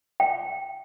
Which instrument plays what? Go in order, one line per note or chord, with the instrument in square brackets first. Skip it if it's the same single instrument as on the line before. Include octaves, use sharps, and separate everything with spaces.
[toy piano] G5